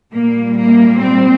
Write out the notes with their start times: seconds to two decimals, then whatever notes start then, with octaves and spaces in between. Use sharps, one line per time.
0.14 A#2 G3 A#3
0.58 A#3
1.02 C4